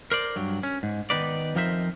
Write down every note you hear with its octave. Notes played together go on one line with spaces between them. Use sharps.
A#4 C5 D5
G2 F#3
C#4
G#2
D#3 B3 D#4 B4 D5
F2 F3 D#4 A#4 C5 E5